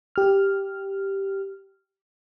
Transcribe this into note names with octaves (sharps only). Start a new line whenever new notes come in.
G4 F6